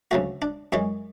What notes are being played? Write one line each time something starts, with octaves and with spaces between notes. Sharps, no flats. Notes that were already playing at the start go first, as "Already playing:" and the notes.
D2 C#3 F#3 A3 F#4
D4
F#2 E3 G#3 C#5